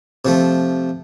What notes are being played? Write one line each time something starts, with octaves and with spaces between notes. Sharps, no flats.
C3 F3 A3